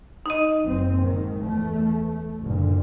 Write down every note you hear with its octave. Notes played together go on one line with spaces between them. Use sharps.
D#4 D#5
F#1 C4
G#2 D#3
E2 A3
F#1 A#2 D3